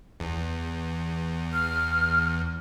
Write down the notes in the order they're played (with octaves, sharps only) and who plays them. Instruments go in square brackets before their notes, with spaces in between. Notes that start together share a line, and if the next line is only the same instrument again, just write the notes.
[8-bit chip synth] E2
[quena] F6